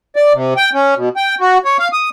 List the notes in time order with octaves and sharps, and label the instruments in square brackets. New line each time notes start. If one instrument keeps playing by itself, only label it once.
[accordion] D5
C3
G5
C#4
B2
G5
F#4
C#5
F5
D#6